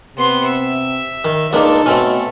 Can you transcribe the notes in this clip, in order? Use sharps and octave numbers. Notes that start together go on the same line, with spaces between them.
C3 B3 C6
E5
D#3
C#2 A#3 D4 D#4 A4
B2 A3 C4 C#4